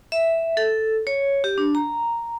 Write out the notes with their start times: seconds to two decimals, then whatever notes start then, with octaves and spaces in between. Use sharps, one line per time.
0.12 E5
0.57 A4
1.07 C#5
1.44 G4
1.58 D4
1.75 A#5